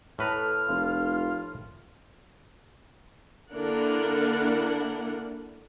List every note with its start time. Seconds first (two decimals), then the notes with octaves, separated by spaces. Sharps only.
0.19 A2 A4 B4 A#5 F6
0.69 F1 F4
3.53 D3 A#3 D4 E4 A#4 F#5